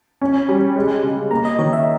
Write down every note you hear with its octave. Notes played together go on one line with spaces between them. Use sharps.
C#4
G3
G#3
C#3
A#3 A#5
D#5
D#3 C#5
E5